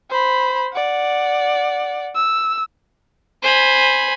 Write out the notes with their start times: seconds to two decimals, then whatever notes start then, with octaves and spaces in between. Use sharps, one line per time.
0.10 C5 B5
0.73 D5 F#5
2.15 E6
3.43 C5 G#5 B5